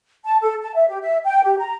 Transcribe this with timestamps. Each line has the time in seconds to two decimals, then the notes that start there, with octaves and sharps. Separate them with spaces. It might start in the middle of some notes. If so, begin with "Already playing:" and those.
0.25 A5
0.42 A4
0.63 A5
0.75 E5
0.88 G4
1.02 E5
1.25 G5
1.44 G4
1.58 A#5